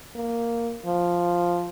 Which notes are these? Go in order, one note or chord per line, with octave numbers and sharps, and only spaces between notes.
A#3
F3